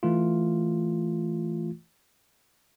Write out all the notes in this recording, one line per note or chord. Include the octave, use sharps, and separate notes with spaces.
E3 A3 F4